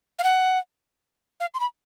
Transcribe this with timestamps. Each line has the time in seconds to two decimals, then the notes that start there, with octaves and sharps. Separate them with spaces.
0.19 F5
0.23 F#5
1.40 F5
1.54 C6
1.60 B5